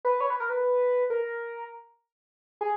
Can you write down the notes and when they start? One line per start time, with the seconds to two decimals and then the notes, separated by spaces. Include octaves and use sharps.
0.05 B4
0.21 C#5
0.30 B4
0.40 A#4
0.50 B4
1.10 A#4
2.61 G#4